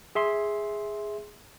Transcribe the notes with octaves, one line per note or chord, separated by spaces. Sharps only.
G#4 E5 C6